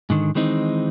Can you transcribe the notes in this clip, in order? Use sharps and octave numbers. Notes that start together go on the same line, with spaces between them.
G#2 D3 D#3
D#3 E3 G#3 C4 D#4